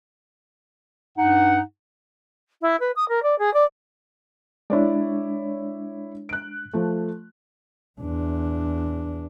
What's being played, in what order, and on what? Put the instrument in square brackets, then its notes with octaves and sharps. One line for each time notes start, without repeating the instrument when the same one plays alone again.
[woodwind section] G2 D#4 F#5
[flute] E4
B4
D#6
A#4
D5
G#4
D5
[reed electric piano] G#3 D4 [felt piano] E4 C#5 D5
[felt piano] F#6 D7
F3 A3
[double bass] E2 D4